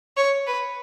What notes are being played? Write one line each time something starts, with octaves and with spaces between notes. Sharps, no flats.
C#5
B4